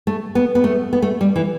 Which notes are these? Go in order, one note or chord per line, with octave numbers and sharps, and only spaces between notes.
A3
B3
B3
A3
B3
A3
G3
E3